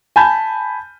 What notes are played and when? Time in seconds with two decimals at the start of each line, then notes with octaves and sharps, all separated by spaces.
0.16 G#5 A5 B5 G6